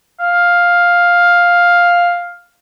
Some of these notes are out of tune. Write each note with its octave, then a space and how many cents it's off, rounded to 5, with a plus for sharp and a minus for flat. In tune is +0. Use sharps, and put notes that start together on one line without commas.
F5 +5